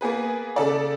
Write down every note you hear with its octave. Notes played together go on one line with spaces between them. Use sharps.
A#3 B3 G#4 B4
C#3 A4 D5